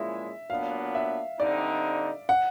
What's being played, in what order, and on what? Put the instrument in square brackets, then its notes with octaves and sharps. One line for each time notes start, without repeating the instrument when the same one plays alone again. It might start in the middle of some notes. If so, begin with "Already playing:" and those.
Already playing: [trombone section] A#2 F3 G#3 C#4 E4 [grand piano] E5
[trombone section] A#2 F#3 B3 D4 [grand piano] F5
[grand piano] E5
[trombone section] D3 G3 C4 D#4 [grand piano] D5
[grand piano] F#5